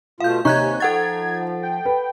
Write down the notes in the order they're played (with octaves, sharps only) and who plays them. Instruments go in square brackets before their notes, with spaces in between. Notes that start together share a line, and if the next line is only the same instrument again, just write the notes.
[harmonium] B2 A3 F4 [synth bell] F5 G6
[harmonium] D#2 C#5 G#5 [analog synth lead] C3 [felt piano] D#4 [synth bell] C#6 F#6 G#6
[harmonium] F3 [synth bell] A4 F#5 A6 [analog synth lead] G#6
[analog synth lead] G5
[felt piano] B4